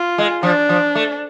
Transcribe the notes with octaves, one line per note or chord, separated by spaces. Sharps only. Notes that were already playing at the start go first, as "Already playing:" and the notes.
Already playing: F4
G#3
F3 D4
F3
A3